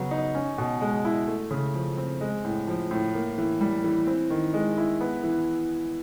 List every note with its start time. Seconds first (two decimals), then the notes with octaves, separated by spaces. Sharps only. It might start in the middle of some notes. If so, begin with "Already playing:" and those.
Already playing: C#3 F#3 B3
0.11 D#4
0.35 C#4
0.58 B2
0.81 G#3
1.05 E4
1.28 A3
1.51 C#3
1.74 F3
1.97 C4
2.21 G#3
2.44 A2
2.67 F3
2.91 A2
3.14 A#3
3.38 E3
3.61 G3
3.84 E3
4.07 C4
4.30 D#3
4.54 G#3
4.78 E4
5.01 B3
5.23 E3